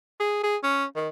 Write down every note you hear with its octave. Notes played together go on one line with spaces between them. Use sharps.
G#4
G#4
C#4
D#3